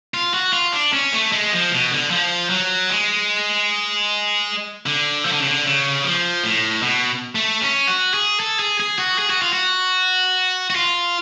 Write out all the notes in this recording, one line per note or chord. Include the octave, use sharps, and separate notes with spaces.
F4
F#4
F4
D4
C#4
A3
G#3
F3
B2
D3
F3
F#3
G#3
D3
F3
D3
C#3
D3
C#3
F3
A2
B2
A3
C#4
F#4
G#4
A4
G#4
G#4
F#4
G#4
F#4
F4
F#4
F#4
F4